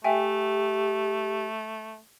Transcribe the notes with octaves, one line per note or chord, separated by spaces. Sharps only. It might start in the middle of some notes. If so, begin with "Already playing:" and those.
A3 G4 E5 G5 G#5